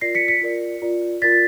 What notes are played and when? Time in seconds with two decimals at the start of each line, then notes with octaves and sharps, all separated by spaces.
0.01 F4 A#4 D5 A#6 C7
0.15 B6 C#7
0.28 B6 C#7
0.41 F4 A#4 D5
0.82 F4 A#4 D5
1.22 F4 A#4 D5 A6 B6